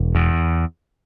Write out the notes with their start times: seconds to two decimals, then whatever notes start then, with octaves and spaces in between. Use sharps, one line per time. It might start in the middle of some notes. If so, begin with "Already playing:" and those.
Already playing: E1
0.15 E2